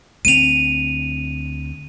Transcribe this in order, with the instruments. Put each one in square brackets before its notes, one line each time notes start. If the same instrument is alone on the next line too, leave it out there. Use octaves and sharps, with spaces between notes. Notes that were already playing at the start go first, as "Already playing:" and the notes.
[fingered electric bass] D2 A#3 C4 [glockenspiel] D#7 F7